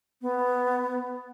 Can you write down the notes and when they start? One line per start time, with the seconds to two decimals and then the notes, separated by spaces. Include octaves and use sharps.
0.22 B3